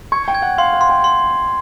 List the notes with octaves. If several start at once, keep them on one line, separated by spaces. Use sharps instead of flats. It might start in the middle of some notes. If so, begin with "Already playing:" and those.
C#6 G#6
G5
G#6
F#5
F5 C6
F#5
C6
G5
C6